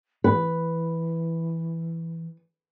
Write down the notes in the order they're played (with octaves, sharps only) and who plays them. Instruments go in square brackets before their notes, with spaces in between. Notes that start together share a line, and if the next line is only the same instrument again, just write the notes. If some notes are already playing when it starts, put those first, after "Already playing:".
[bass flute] E3 [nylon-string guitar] B4